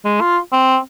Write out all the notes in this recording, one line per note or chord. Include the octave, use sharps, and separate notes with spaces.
G#3
F4
C4